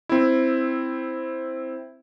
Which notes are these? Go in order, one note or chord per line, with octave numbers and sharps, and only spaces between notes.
C4 E4